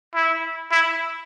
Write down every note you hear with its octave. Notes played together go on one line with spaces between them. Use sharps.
E4
E4